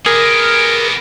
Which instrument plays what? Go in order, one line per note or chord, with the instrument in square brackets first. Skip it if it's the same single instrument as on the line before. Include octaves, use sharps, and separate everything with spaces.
[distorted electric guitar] B3 G4 [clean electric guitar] G#4 [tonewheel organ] A#4